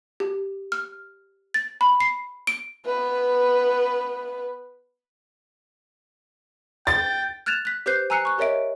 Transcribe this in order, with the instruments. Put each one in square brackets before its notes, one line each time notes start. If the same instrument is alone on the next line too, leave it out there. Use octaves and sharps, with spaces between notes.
[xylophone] G4
F6
A6
B5
C7
D7
[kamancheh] B3 B4
[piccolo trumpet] G5 [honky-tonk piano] A6
[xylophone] F6 F#6 G#6 A6 E7 F7
F#6 B6
G4 B4 C5 F#6 G6 C7
G#5 A#5 E6 F#6 C7 C#7
C#6 F#6
G4 A#4 C#5 D#5 E5 D7